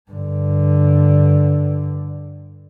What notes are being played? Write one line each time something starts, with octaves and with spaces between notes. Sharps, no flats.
G2 D3